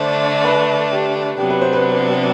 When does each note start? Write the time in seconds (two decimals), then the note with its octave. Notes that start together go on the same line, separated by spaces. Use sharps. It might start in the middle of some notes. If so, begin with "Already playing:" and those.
Already playing: D3 A3 D4 C5
0.45 B4
0.91 G4
1.38 C3 F#3 B3 D4 G4
1.50 B4
1.61 C5
1.73 B4